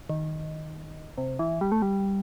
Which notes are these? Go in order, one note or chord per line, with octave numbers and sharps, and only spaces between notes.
D#3
C3
E3
G3
A3
G3